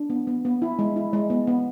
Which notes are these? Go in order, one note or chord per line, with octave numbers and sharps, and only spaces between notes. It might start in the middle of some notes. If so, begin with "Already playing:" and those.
Already playing: D4
B3
B3
B3
E4
G#3
E4
G#3
B3
B3